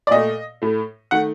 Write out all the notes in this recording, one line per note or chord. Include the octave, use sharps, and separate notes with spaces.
D5
A#2 A3 D#5
A2 A3
D#3 A3 F#5